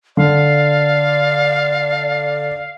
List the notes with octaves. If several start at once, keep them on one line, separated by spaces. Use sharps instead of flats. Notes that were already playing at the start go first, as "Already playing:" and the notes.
D3 D5 F5